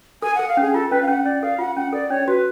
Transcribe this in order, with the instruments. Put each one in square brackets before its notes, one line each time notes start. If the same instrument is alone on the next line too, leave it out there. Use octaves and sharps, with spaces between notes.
[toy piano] A4 [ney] G#5
[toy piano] A4 [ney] F#5
[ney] F5
[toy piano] C#4 [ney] G#4
[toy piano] F4 [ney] A4
[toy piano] C#4 [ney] B4
[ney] F5
[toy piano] C#4 [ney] F#5
[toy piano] C#4 [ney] D5
[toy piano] A4 [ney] F5
[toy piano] F4 [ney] F#5
[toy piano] C#4 [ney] F#5
[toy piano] A4 [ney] D5
[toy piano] C#4 [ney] C#5
[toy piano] F#4 [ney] B4